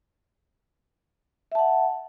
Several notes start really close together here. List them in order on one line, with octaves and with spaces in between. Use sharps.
E5 A5 F#5